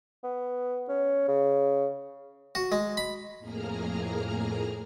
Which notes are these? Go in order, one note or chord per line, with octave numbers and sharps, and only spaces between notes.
B3
C#4
C#3
F#4
G#3
B5
F2 A2 A#3 G#4 A#5 F6